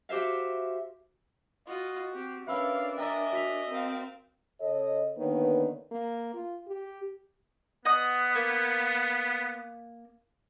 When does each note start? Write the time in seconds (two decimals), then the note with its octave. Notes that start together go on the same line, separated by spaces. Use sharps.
0.09 F#4 G4 C5 E5 F5
1.67 F4 F#4 D#5
2.13 C4 G4
2.47 C#4 D4 A#4 B4 E5 F5 B5 E6
2.98 D#5 E5 G5 G#5 A#5 A6
3.33 F#4 B6 F7
3.70 C4 A#4 F5
4.61 C#3 A4 C#5 D#5
5.17 D3 D#3 A#3 B3 B4 C#5
5.91 A#3
6.34 F4
6.67 G4
7.85 B3 D#5 F#5 D#6
8.36 A#3